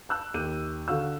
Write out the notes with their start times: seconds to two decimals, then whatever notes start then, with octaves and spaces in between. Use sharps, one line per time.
0.09 A5 E6 F#6
0.34 D#2 D#3 D6 G6 D#7
0.88 D3 F#4 F5 E6